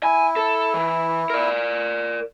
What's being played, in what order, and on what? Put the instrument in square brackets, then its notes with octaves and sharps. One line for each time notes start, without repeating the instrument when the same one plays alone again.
[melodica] E4 [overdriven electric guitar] G#5
[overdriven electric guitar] A4
E3
A#4 D5